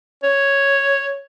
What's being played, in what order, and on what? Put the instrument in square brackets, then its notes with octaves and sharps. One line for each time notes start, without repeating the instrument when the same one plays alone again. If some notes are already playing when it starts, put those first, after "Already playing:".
[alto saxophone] C#5